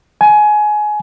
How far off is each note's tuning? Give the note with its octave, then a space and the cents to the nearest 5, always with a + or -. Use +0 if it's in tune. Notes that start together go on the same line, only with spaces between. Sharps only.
G#5 +20